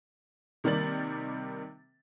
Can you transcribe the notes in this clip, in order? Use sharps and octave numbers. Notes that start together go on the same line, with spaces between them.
C3 D#3 G3 A#3 A6 F#7